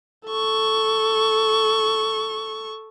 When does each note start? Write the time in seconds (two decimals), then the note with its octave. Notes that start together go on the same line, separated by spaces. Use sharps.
0.27 A4 C#6